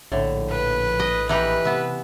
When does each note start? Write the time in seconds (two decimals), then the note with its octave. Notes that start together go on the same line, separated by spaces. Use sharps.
0.12 A#1 A2 D3
0.50 B4
1.00 D#5
1.29 E3 D#4 G4 B4
1.65 C3 B3 E5